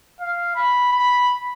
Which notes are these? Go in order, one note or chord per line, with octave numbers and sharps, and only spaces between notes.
F5
B5
B5